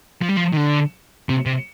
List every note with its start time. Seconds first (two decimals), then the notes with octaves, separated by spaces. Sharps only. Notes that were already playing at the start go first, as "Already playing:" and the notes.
0.22 F3
0.29 G3
0.37 F3
0.53 D#3
0.57 D3
1.29 C3
1.46 C3